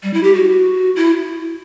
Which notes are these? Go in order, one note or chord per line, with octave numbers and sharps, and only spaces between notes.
G3
E4
G4
F#4
E4